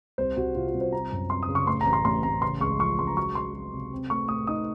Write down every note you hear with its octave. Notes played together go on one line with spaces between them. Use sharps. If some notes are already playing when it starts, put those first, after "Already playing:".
C2 C5
C2 F#4
C3 F4
F4
C2
C5
C4 A#5
F#2
C4 C6
D#6
C#3
C#6
A2 C6
A#5
A1
C6
A1 C6
A1 A#5
C#3 C6
C#2 C#6
F3 C#6
C#2 C6
A#5
F#3 C#6
F#3 C6
F#3
C3
C4
A3 C#6
A2 D#6
D#4 D#6